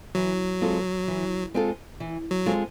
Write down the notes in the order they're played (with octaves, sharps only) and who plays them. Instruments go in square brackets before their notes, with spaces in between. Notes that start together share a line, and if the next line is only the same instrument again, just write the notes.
[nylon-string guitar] E3 [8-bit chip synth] F#3
[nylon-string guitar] G#3 C4 F4 A4
E3
G#3 C4 F4 A4
E3
[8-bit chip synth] F#3
[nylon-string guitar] G#3 C4 F4 A4